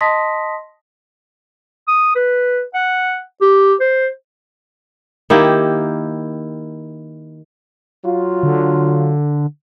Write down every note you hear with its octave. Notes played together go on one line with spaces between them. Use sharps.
D#5 A5 C6 D#6 A#6 B6
D#6
B4
F#5
G4
C5
D#3 A#3 E4 G4
F#3 F4
D3